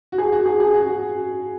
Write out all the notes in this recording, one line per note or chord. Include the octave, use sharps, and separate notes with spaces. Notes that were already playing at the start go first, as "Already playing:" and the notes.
F#4
G#4
F#4
G#4
G#4
F#4